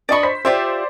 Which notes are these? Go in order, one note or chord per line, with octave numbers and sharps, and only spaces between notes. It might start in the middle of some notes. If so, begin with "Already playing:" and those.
D4 D5 D#5 B5 C#6
C5 B6
F4 G4 C5 D5 E5